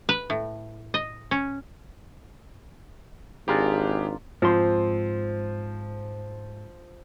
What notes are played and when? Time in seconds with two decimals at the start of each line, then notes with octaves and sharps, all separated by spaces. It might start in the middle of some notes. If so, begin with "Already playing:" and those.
0.09 B4
0.30 A2
0.94 D#5
1.31 C#4
3.48 G#1 D4 F4 G4 G#4 A#4
4.42 G#2 F3 C4 C6